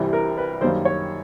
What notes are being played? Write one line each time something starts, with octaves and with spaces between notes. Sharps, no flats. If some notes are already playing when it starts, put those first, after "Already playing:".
Already playing: C2 C3 E3 G3
A#4
B4
F#2 D#3 G3 A#3 C5
C#5